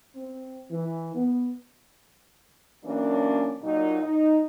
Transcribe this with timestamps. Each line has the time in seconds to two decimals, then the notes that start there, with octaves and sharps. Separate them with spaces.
0.16 C4
0.71 E3
1.15 B3
2.84 E3 F#3 A#3 C#4 D4
3.62 A#2 F#3 D#4
4.01 D#4